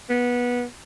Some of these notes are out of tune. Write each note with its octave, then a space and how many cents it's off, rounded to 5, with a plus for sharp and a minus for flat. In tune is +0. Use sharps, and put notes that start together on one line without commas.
B3 -20